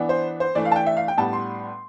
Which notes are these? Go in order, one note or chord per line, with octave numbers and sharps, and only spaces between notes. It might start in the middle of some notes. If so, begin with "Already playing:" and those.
Already playing: E3 B3 D4
C5
C5
E3 A3 D4 D5
F5
A5
G5
E5
F5
G5
A2 G3 B3 D4 A5
C6